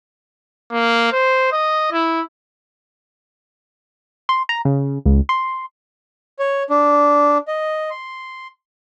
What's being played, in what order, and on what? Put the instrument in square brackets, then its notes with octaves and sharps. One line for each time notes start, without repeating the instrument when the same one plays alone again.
[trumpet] A#3
C5
D#5
E4
[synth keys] C6
A#5
C#3
C#2
C6
[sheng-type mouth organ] C#5
D4
D#5
C6